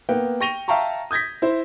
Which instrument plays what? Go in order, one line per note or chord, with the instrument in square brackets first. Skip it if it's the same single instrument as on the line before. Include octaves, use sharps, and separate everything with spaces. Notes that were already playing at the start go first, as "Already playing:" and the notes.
[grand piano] A#3 B3 G5
G5 C#6 A#6 D#7 F7 G7
E5 F5 G5 A5 A#5 C#6
D#6 G6 G#6 A#6 B6
E4 C5